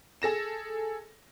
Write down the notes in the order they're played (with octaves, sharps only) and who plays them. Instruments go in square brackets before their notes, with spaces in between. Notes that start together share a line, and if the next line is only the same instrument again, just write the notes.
[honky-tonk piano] G#4 A4 A#6 E7